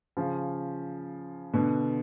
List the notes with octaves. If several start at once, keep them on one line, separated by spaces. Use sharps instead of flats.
C#3 F3
B2 D3